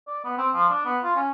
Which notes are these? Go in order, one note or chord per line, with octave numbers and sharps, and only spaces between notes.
D5
B3
C4
F3
D4
B3
F4
C#4